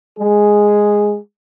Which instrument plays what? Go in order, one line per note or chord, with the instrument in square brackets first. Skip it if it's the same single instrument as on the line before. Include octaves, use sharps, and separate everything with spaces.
[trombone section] G#3 G#4